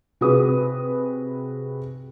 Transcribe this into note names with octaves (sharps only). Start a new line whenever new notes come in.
C3 F#4 G#4 B4 D#6